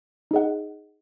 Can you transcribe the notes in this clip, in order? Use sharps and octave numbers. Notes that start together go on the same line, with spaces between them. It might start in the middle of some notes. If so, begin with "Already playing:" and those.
D#4 G#4 D#5 F#5